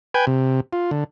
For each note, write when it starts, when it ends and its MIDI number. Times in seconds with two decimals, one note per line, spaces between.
0.14 0.25 71
0.14 0.25 79
0.14 0.25 80
0.27 0.61 48
0.73 0.91 65
0.91 1.04 50